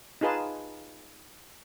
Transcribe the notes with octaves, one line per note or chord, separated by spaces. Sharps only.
D#4 F4 G#4 B4 A5